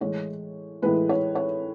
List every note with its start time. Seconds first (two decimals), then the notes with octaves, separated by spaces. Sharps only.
0.01 A2 E3 G#3 C#5
0.82 A2 E3 G#3 B4
1.09 C#5
1.35 C#5